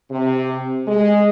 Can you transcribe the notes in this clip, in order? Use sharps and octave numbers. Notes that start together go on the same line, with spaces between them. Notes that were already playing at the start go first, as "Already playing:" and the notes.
C3
G#3